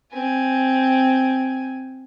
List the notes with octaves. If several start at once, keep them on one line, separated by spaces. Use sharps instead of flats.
C4 G#5